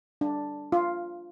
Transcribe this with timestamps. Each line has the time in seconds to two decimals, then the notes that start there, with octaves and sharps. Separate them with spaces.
0.21 D4
0.72 F4